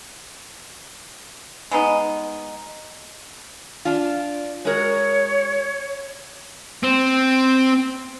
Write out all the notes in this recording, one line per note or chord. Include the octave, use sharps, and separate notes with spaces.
G#3 B3 D#4
D4 F4
G#3 F#4 A#4 C#5
C4